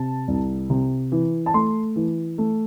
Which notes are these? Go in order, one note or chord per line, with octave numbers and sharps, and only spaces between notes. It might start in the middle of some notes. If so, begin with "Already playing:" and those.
Already playing: C3 A5
C2
C3
E3
A5
A3 C6
E3
A3